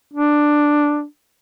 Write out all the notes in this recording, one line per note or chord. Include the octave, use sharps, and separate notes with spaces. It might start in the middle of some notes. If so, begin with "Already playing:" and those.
D4